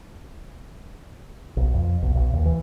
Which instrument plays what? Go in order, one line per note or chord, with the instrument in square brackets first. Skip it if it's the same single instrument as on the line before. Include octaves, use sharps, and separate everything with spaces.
[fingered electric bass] B1
F2
B1
B1
D#2
E3